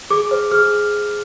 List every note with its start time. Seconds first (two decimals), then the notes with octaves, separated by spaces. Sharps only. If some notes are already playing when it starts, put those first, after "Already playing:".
0.10 G#4 D6
0.31 C5
0.51 G#4 F6